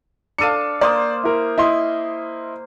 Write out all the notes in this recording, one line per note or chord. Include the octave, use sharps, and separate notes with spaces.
D4 A4 F5 C#7 D#7
A#3 C5 D5 D#6
E4 A#4
E4 D#5 C6